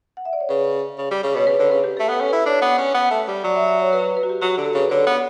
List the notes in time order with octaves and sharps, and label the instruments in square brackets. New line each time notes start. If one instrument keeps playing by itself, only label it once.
[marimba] F#5
E5
D5
C#5
[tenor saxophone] C#3 [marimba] B4
[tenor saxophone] C#3
G3
C#3
[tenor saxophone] B2 [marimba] C#5
[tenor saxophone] C#3 [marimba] B4
[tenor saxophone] D3 [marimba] C#5
[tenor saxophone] C#3 [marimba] B4
[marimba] G4
[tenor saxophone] A3 [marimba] A4
[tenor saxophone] B3 [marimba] B4
[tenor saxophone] C#4 [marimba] A4
[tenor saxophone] E4 [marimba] B4
[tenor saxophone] D4 [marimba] C#5
[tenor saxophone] B3
C#4
B3
A3
G3
[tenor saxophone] F#3 [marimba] D5
[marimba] E5
E5
C#5
B4
B4
B4
F#4
G4
[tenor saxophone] F#3 [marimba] F#4
[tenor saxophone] D3 [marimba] G4
[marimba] A4
[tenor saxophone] C#3 [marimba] B4
[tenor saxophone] D3 [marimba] C#5
[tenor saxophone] B3